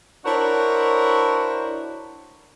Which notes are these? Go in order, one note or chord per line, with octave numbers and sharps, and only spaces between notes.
D4 E4 F#4 A#4 C5 C#5